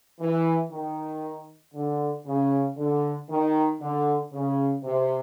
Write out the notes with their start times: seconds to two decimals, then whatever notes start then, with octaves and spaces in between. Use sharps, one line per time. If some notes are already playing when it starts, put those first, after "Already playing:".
0.21 E3
0.72 D#3
1.74 D3
2.26 C#3
2.77 D3
3.29 D#3
3.81 D3
4.32 C#3
4.84 C3